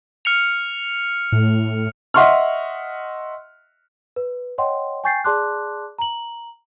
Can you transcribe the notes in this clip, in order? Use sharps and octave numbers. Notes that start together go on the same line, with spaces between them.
F6 C#7 F7
A2
D#5 E5 F#5 C6 C#6 F6
B4
C#5 D#5 F#5 G5 C6
G5 G#5 C#6 G6 A6 C7
G#4 D5 A5 C6 D6 F#6
A#5 F#7